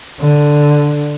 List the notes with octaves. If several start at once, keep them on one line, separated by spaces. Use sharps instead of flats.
D3